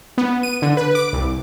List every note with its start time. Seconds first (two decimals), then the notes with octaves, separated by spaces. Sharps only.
0.18 B3
0.43 D#7
0.62 D3
0.77 B4
0.95 D6
1.13 C2